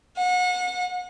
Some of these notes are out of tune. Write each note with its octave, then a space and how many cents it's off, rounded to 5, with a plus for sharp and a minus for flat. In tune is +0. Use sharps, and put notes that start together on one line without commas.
F#5 -35